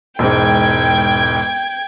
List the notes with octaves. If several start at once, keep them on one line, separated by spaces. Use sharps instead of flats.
E1 G#2 G5 G#6